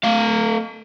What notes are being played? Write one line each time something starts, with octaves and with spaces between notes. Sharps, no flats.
A3 F5